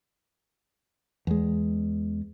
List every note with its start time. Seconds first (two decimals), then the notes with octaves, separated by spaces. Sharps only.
1.27 E2 G#3